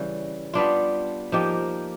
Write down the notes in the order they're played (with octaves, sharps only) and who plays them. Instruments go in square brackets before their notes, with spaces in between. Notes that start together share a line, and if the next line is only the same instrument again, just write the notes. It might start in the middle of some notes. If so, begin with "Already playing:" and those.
Already playing: [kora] C#3 E3 G3
G3 B3 D4 F4
F3 A#3 D#4 G4